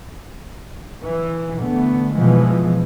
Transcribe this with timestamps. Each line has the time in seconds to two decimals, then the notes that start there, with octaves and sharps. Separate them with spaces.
1.03 E3
1.60 D3 A3 B3
2.15 B2 E3 F3 G#3